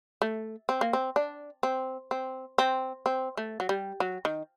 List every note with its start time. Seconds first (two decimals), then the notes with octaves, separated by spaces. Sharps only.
0.22 A3
0.69 C4
0.81 A#3
0.93 C4
1.16 D4
1.63 C4
2.11 C4
2.58 C4
3.06 C4
3.37 A3
3.60 F#3
3.69 G3
4.00 F#3
4.25 D#3